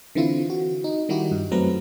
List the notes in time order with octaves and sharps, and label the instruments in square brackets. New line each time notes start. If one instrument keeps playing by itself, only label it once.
[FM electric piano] D3 E3 C4 E4 F4
F#4
D#4
D#3 G3 D#4 E4 F#4 G4
G2
F#2 F#3 A3 C4 B4 A#5